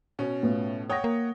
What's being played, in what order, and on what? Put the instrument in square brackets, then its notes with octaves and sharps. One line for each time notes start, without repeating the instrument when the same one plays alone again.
[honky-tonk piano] B2 C#4
[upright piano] A2 B3 F4
[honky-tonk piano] C#5 F#5 G5 [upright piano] D#6 A#6
[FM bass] A#3